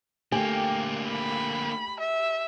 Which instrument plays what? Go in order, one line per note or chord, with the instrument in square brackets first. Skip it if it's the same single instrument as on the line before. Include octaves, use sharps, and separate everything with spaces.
[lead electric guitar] D3 A#3 [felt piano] A3 G5 G#5 [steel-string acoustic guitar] G4
[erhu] B5
E5